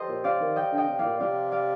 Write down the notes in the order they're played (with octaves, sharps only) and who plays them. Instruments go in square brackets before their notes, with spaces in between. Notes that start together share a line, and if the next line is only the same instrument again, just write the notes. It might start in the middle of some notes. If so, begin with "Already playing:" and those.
Already playing: [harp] G4 A4 C5 D#5
[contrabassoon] A#2
[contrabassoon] C3 [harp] D5 F5
[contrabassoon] D#3
[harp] D#5 G5
[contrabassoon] D3
[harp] D#5 G5
[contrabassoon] C3
[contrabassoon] A2 [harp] D5 F5
[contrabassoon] A#2
[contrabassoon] C3 [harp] D5 F5
[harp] D5 F5